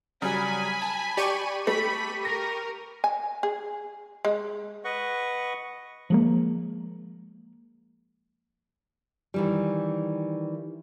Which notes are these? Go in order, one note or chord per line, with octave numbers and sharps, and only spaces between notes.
C#3 F#3 G3 G#5 B5
A5
G4 D5 C#6 D#7
A3 B5
A#4 A#6
G#5
G#4
G#3
B4 D#5 F#5 C#6
F3 G#3 A#3
D#3 E3 G3